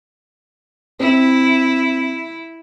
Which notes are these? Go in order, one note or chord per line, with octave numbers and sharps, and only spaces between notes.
C4 E4